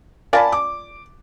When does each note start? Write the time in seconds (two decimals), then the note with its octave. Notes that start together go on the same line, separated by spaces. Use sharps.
0.33 F4 A#4 D5 G#5 A5 B5
0.52 D6